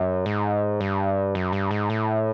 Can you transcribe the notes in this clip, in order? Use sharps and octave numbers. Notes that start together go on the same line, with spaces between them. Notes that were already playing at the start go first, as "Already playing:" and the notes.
Already playing: F#2
G#2
G2
F#2
G2
G#2
A2